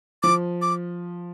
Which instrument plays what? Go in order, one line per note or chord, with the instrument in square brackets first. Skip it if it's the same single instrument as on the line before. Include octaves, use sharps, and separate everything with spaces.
[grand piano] F3 [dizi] D6
[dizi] D6